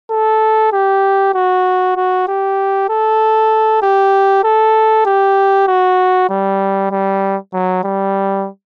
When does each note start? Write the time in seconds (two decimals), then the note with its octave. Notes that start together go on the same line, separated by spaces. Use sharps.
0.11 A4
0.73 G4
1.35 F#4
1.96 F#4
2.28 G4
2.89 A4
3.83 G4
4.44 A4
5.06 G4
5.68 F#4
6.30 G3
6.92 G3
7.54 F#3
7.84 G3